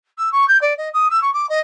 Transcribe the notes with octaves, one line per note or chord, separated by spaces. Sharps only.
E6
C#6
G6
D5
D#5
D#6
E6
C#6
D6
D#5